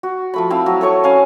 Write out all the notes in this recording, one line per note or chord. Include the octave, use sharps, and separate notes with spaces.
F#4
F3 A3 B5
C4 E4 F5
F#3
A3 A4 C#5 C#6
C#4 F5 G#5